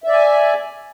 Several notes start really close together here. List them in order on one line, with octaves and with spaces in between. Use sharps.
E5 D5 G#5